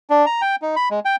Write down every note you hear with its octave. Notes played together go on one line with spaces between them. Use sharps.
D4
A#5
G5
D#4
B5
G#3
G5